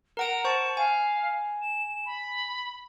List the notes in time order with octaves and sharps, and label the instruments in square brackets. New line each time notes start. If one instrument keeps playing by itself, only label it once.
[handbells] A#4 F#5 D7 [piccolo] A#5
[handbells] C5 C#6 [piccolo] A5
[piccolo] F5 [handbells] G#5
[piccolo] E7
B5